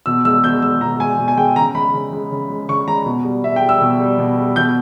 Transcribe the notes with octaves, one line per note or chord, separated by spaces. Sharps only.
B2 E6
G#3 E6
B2 G6
G#3 E6
B2 A#5
G#3 G#5
B2
G#5
G#3 G5
C#3 A#5
G#3 B5
C#3
G#3
C#3
G#3
C#3 C#6
G#3 A#5
B2
G3
B2 E5
G5
G3
E6
B2
G3
B2
G3
B2 G6